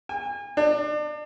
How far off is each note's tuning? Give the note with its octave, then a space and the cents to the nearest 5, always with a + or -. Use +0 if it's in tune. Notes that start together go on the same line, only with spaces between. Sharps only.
G#5 -40
D4 +35